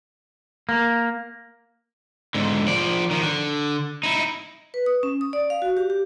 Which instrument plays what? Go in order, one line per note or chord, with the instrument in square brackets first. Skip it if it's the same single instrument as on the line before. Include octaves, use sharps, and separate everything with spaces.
[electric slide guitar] A#3
[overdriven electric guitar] G#2 D3
F3 D5
D#3 F3
D3
D#4 E4
[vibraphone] B4
D#6
C#4
D#6
D5
F5
F#4
G4
G4